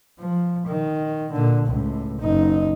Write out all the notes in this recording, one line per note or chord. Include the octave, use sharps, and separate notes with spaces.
F3
D#3
A#2 D3
C#2 A2
F#1 D#4